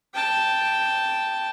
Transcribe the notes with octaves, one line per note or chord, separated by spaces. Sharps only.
G5 A5